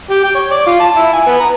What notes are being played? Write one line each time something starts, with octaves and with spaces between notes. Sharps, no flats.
G4
G5
C#5
D5
F4
A5
E4
G#5
B3
A#5